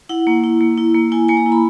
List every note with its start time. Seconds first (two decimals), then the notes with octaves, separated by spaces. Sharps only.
0.09 E4 F#5
0.27 A#3
0.44 E4
0.61 A#3
0.77 E4
0.95 A#3
1.12 E4 G#5
1.29 A#3 G#5
1.37 A#5
1.46 E4
1.52 B5